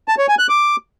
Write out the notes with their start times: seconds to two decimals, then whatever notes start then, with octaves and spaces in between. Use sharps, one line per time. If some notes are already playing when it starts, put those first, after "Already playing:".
0.08 A5
0.18 C#5
0.29 G#5
0.39 F#6
0.49 D6